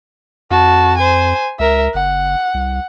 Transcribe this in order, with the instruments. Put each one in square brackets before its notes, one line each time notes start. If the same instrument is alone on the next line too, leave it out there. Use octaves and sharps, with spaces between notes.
[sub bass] F2 [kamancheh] F#4 A5
[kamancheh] C5 G#5
[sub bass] C#2 [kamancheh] A#4 E5
[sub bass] F#1 [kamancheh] F#5
[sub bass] C2